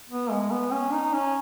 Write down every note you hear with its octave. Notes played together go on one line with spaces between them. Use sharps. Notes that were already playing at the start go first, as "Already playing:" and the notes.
B3
G#3
B3
C#4
D#4
C#4